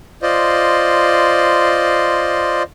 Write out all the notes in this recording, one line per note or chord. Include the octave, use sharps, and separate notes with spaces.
F4 C5 D5 D#5